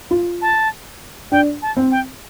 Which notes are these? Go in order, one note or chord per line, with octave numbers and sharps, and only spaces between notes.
F4
A5
D4 G5
A5
C4
G5